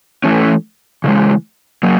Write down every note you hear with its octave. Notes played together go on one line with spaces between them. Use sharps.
E3 A3 C#4
C#3 E3 G#3
F#3 A#3